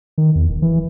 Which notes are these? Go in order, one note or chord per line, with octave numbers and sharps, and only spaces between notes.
D#3
E2
D#1
E3